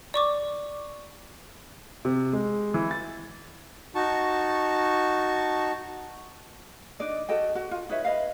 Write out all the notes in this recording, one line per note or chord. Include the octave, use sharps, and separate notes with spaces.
D5 C#6 D6
C3
G#3
E3
A6
D#4 F#4 A5 C#6
D4 D#4 D5 D#5
F#4 A4 D#5 G5
F#4
F4
D#4 B4 C#5 E5
B4 D#5 F5